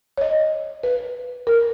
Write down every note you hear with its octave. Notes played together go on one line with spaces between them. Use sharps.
C#5
D#5
B4
A#4